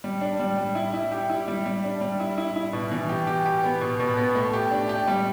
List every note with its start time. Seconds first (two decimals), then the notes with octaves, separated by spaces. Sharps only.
0.04 G3
0.21 D4
0.40 G3
0.58 G3
0.75 E4
0.94 E4
1.12 G4
1.30 E4
1.48 G3
1.66 G3
1.84 D4
2.01 G3
2.20 E4
2.38 E4
2.56 E4
2.73 B2
2.92 E3
3.09 G4
3.27 G4
3.46 G4
3.64 B3
3.81 B2
4.00 B2
4.17 B3
4.35 A3
4.53 G4
4.71 D4
4.89 G4
5.08 G3